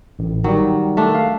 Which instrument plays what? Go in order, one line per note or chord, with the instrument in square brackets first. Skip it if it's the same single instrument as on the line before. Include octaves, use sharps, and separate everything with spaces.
[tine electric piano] A1
[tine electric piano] D#3 G3 [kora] F#3
[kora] A3 D4
[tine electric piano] F5